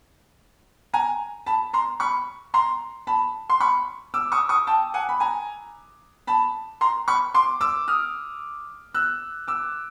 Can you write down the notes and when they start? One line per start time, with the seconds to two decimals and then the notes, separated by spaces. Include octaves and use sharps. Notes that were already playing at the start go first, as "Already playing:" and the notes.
0.94 G#5 A#5
1.46 A5 B5
1.73 A#5 C6
2.00 B5 C#6
2.54 A#5 C6
3.07 A5 B5
3.50 C6
3.60 B5 C#6
4.14 D6 E6
4.32 C#6 D#6
4.49 C#6 D#6
4.67 G5 A5
4.94 F#5 G#5
5.09 B5
5.20 G#5 A#5
6.27 A5 B5
6.81 A#5 C6
7.08 B5 C#6
7.34 C6 D6
7.61 D6 E6
7.88 D#6 F6
8.94 E6 F#6
9.48 D6 E6